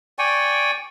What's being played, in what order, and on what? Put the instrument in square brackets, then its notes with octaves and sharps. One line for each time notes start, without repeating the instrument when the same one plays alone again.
[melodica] D5 G5 G#5 C#6